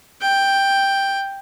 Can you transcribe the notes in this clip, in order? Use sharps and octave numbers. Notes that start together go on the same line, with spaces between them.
G5